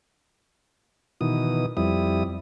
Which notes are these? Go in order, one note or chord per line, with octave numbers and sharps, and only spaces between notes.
B2 D#3 E3 D#6
F2 G3 E4 D#6